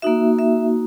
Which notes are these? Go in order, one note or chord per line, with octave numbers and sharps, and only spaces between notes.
A#3 D#4 F#4 E5
E5